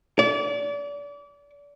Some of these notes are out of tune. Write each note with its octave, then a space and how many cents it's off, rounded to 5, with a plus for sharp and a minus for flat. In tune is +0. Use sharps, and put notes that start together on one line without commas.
D5 -30